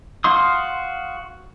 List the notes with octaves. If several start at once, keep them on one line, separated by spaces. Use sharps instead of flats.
F#4 F5 C6 D#6